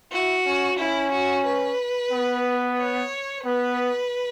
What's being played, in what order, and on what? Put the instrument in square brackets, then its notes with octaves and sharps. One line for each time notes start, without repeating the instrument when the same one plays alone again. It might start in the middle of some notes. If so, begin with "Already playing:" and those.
[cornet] E4 [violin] F#4
[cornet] C#4
[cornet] C#4 [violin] E4
[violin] F#4
B4
[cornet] B3
[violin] C#5
[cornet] B3 [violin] B4